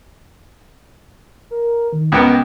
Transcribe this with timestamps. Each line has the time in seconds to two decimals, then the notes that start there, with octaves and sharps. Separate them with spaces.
1.51 A#4
1.93 D#3
2.12 C#2 B3 A#4 G5